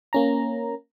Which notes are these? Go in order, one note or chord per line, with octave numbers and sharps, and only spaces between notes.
A#3 C#4 A#5